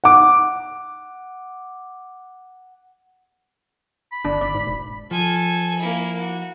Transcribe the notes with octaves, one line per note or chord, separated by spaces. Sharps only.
F#5 D6
B5
G1 D4
G1 D5
G#2
E1
F3 A4 G#5
A#3 E4
F#4